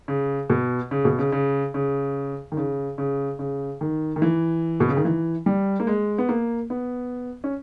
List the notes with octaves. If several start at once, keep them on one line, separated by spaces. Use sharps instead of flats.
C#3
B2
C#3
B2
C#3
C#3
C#3
D#3
C#3
C#3
C#3
D#3
D#3
E3
B2
C#3
D#3
E3
G3
A#3
G#3
B3
A#3
B3
C#4